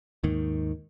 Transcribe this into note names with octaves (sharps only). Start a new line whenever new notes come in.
D#2 G#2 D#3